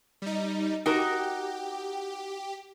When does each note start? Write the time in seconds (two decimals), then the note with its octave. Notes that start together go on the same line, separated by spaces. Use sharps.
0.22 G3 D#4
0.86 D#4 F#4 G4 A#4